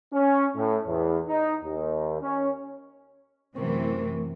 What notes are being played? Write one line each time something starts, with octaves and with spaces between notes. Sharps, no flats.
C#4
A2
E2
D#4
D#2
C#4
F#2 C3 E3 A3 C4 A#4 C#6